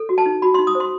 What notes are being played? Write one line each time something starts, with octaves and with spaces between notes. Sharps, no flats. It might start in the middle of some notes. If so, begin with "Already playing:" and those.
Already playing: A4
F#4
A5
D#4
F#4 B5
C6
D#4
D#6
C5
C6